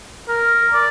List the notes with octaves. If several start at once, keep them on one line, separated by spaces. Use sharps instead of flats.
A#4
D5